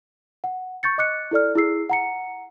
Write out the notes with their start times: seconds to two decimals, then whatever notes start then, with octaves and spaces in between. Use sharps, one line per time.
0.44 F#5
0.83 C#6 G6 A6 C#7
0.98 D#5 D6 F#6 C#7
1.31 E4 A4 D5 F6
1.55 E4 G#4 E6 C7
1.90 F#5 A#5 C#7